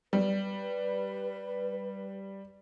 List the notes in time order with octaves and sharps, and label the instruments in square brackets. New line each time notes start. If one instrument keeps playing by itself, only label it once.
[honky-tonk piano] G3 [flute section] B4